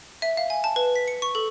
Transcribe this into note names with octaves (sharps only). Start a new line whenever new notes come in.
E5
F5
G#5
A5
B4
B6
C#7
C#6
A4